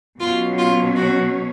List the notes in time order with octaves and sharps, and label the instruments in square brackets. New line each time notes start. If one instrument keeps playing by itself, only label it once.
[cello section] B2 F#3 C#4 [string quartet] F4
[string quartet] F4
F#4